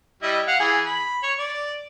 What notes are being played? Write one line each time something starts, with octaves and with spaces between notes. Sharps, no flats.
G3 E4 D#5
F5 F#5
E3 G#4
B5
C#5
D5